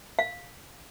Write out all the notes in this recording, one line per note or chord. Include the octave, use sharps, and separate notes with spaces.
F5